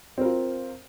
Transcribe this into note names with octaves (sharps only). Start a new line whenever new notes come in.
C4 F4 A#4